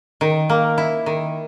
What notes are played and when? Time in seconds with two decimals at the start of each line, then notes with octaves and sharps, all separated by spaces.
0.21 D#3
0.50 A#3
0.78 E4
1.06 D#3